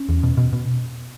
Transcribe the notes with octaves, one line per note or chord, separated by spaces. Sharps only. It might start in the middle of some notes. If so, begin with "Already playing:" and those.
Already playing: C#4
E2
B2
B2
B2